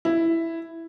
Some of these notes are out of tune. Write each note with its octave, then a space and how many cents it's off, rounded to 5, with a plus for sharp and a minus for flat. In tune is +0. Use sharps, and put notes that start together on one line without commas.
E4 +5